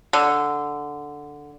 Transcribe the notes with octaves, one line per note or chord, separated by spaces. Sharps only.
D3